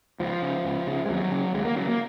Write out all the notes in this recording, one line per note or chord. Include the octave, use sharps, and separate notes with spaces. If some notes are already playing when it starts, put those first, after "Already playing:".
C#2 F3
C#3
C#2
C#3
G#3
D#2 F#3
C#3
D#2 G#3
A#3
C#3 F#3
A#3